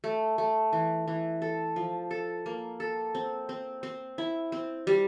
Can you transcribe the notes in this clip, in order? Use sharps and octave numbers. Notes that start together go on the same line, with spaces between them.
A3
A3
E3
E3
A4
F3
A4
A#3
A4
C4
C4
C4
E4
C4
G3